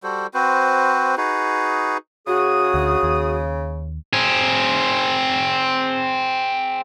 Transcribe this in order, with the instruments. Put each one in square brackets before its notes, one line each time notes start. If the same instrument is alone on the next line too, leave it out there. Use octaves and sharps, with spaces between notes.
[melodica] G3 F#4 A4 C5
C4 F#4 B4 C5
D#4 F#4 G#4 B4
[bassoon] C#3 [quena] F#4 [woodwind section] G#4 D#6
[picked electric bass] D2
D#2
[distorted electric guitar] C4 G#4